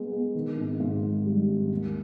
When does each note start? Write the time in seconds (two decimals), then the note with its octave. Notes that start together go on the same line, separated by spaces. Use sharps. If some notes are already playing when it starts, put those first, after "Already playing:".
Already playing: G#3 B3
0.12 B3
0.35 D#3
0.57 G#1
0.80 G#2
1.03 D#3
1.26 G3
1.49 G#1
1.71 D#2